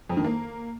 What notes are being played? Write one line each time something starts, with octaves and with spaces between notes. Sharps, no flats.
F2
D#3
A#3